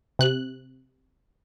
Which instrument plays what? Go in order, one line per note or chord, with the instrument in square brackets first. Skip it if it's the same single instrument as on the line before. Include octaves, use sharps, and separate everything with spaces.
[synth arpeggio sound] C3 F#6